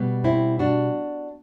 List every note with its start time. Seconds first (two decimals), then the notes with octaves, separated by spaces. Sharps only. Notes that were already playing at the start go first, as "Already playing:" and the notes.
Already playing: B2 G3 B3
0.24 C4 E4
0.59 D4 F#4